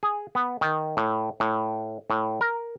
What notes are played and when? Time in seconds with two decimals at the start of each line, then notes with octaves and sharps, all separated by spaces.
0.03 G#4
0.35 B3
0.61 D#3
0.97 A2
1.40 A2
2.10 A2
2.41 A#4